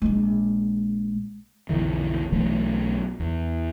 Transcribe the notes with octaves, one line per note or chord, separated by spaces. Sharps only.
A#1 G#3
B1 F2 D3 E3
B1 E3 F#3 A3
E2